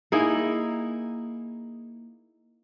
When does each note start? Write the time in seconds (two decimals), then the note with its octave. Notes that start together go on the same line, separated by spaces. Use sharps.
0.12 A#3 D#4 E4 G#4